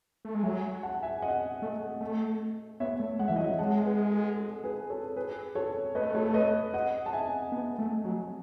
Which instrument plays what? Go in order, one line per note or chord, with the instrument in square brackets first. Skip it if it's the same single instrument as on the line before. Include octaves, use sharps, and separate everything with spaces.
[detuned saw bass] A3
G#3
[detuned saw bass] F#3 [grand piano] E5 G#5
[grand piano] F#5 A5
E5 G#5
D#5 F#5
[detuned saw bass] A3
A3
[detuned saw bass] B3 [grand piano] C#5 E5
[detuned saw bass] A3
[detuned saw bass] G#3 [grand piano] F#5
[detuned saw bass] E3 [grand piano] E5
[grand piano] D#5
[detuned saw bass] F#3
[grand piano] C#5 E5
[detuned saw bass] G#3 [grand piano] F#5 A5
[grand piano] G#4 B4
A4
A4
G#4 B4
A4 C#5
G#4 B4
A4 C#5
[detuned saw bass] A3 [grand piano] B4 D#5
[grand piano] A4 C#5
B4 D#5
D#5 F#5
A5
E5 G#5
[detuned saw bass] B3
A3
F#3